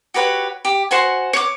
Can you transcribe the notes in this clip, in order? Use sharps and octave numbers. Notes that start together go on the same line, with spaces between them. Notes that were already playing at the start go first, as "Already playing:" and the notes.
F#4 G4 B4 C#5
G4
F#4 C5 F#5 G#5
C#5 D6